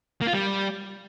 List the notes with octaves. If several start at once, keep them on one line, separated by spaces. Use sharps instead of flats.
A#3
F4
G3